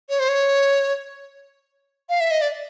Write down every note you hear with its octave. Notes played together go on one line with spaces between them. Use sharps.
C#5
C5
C#5
F5
E5
D#5
D5